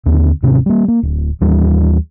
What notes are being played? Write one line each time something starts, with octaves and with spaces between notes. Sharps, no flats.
D#2 D3 C4
D#1 G#2 C3 C#4
G3 A#3
A#3
D1
D#2 E3 G3